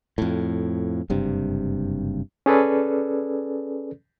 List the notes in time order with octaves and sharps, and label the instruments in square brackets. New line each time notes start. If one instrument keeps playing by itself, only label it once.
[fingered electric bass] F2 A2
F#1 G2 C3
[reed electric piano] C#4 G#4 A4 B4 D5